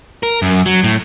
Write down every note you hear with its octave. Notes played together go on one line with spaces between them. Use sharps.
A#4
F#2
F#3
A2